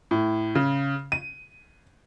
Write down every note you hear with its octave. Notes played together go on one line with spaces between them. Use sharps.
A2
C#3
D#7